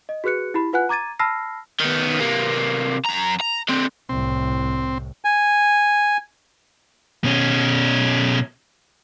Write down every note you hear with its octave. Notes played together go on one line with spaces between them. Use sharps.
D#5
F#4 G#4 B4 F#6 C#7
E4 G4 B5
F4 B4 F#5 G#5 F#6
A#5 D6 G#6 A6 D#7
A5 B5 E6 F6 A#6 C7
D#3 B3
C3 A#3
F#2 A#5
A#5
D3 C4
C2 A2 C4
G#5
B2 C#4